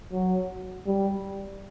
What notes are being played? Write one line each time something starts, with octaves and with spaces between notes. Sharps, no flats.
F#3
G3